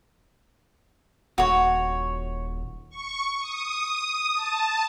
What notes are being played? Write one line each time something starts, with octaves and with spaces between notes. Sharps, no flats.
D#1 F#4 C#5
C#6
D#6
A5